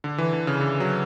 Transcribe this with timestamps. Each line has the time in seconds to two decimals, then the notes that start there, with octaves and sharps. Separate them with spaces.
0.04 D3
0.18 E3
0.33 D3
0.47 C#3
0.61 D3
0.80 F#3